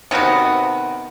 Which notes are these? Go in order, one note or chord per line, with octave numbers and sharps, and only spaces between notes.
C3 D#3 B3 F#4